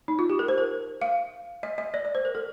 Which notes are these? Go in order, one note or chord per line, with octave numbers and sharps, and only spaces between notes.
D#4
F4
G4
A#4
C5
A#4
F5
D#5
D#5
D5
D5
C5
A#4
A4